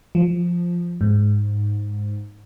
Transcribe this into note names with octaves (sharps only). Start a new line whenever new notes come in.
F3
G#2